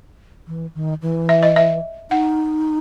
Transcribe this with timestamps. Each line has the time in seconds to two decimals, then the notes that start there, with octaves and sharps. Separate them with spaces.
0.47 E3
0.75 D#3
1.02 E3
1.29 E5
1.43 D#5
1.56 E5
2.11 D#4 F#5